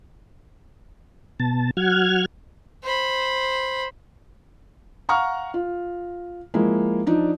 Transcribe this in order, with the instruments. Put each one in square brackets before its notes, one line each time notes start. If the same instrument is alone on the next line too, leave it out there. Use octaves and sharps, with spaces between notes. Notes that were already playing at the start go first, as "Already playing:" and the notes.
[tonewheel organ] B2 A5
F#3 F#5 F6 G#6
[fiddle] C5 B5
[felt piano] F5 F#5 A#5 C#6 F6
F4
F3 G#3 A#3 E4
F3 D4 D#4 D5